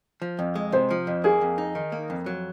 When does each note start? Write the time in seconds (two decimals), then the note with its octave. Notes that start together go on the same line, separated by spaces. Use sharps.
0.22 F3
0.39 F2
0.56 G#3
0.72 C3 C5
0.91 F3
1.07 F2
1.24 A#3 G#4
1.41 F2
1.58 D#4
1.75 D#3
1.92 A#3
2.10 F2
2.26 F#3